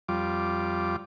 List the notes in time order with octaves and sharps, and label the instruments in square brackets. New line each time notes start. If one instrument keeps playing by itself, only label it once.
[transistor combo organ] F2 G3 F4 D6